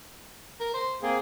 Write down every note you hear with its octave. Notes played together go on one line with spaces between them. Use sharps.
A#4
C5
A#3 C4 G#4